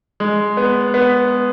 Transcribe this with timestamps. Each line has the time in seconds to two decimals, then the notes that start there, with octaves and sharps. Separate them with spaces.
0.20 G#3
0.57 B3
0.94 B3